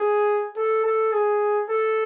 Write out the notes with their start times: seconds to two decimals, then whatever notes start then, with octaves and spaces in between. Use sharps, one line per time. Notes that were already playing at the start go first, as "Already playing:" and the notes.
Already playing: G#4
0.56 A4
0.85 A4
1.13 G#4
1.68 A4